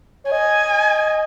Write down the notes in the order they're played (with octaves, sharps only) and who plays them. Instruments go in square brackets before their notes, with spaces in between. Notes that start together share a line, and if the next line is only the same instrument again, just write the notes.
[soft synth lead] C#5
[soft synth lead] D#5 [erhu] G#5